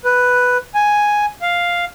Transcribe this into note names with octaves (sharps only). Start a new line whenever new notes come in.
B4
G#5
F5